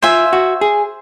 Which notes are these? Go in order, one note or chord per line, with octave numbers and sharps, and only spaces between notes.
F4 C5 E5 G#5
F#4
G#4